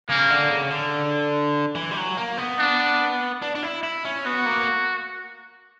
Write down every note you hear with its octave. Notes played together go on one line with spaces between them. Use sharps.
C#3 A#3
D3
C#3
D3
E3
G3
F#3
A#3
B3
D4
D4
D4
E4
E4
C#4
B3 F#4
A#3